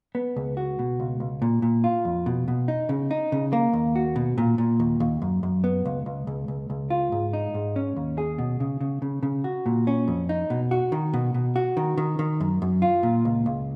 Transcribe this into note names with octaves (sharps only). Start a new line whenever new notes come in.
B3
C#2
F#4
B2
C#2
C#2
A#2
A#2
F4
F2
B2
B2
D#4
C#3
D#4
C#3
A#3
D#2
F#4
B2
A#2
A#2
D#2
D#2
F#2
F#2
B3
C#2
C#2
C#2
C#2
C#2
F4
G#2
D#4
G#2
C#4
D#2
G#4
B2
C#3
C#3
C#3
C#3
F#4
A#2
C#4
F2
D#4
B2
F#4
D#3
B2
B2
F#4
D#3
D#3
D#3
F#2
F#2
F4
A#2
C#2
C#2